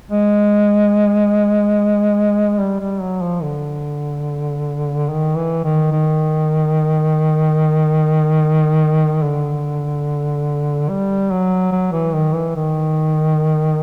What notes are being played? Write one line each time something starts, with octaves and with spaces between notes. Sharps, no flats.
G#3
G3
G3
F#3
F3
D3
D#3
E3
D#3
D#3
D3
G3
F#3
F#3
E3
D#3
E3
D#3